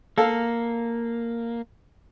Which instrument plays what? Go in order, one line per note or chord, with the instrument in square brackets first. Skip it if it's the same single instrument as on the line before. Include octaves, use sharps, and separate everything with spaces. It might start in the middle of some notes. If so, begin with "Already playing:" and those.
[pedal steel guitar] A#3 [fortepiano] A4 F5